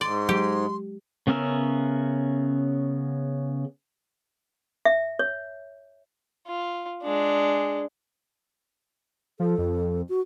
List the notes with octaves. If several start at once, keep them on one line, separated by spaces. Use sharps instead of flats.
G#2 D5 C6
F#3 G#3 G4
C#3 B3 C#4 A#4 E5
E5
C#5
F4
G#3 D4
F3 A4
F2
F#4